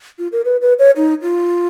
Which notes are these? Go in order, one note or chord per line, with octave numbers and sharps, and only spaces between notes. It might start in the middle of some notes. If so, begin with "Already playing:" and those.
F4
A#4
B4
B4
C#5
D#4
F4